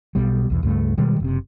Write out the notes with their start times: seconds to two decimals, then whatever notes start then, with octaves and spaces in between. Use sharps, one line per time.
0.15 B1 B2 G3
0.50 B1 E2
0.63 C#2 G2 A3
0.97 B2 D#3 G3 G#3
1.20 F#1 C3